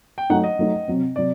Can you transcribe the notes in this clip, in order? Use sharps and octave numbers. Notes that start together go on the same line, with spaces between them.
G5
F#3 A3 D#4 F#5
D#5
F#3 A3 D#4
C3 F#3 C4
C3 F#3 D5